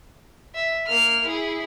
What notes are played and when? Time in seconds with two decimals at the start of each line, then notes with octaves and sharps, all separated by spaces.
0.55 E5
0.86 A#3 F6
1.24 E4 G#4